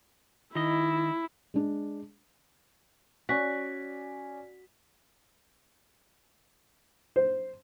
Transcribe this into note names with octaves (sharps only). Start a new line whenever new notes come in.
D#3 E4 D#5
G#3 D4
C#4 F#4 D5 G#5 B6
C5